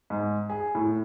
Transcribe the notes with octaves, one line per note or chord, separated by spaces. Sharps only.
G#2
G#4
A2